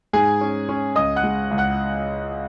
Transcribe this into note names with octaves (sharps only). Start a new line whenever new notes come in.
G#2 G#4 G#5
C#4
C#4
C#2 D#5 D#6
F#5 F#6
G#3
C#2
F#5 F#6